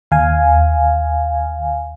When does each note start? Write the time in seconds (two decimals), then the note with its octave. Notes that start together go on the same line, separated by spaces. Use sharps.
0.11 D#2 F5 G#5